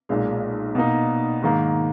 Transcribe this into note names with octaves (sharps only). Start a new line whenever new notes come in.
B1 A#2 G#3
B2 A#3 D#4
G#2 D#3 A#3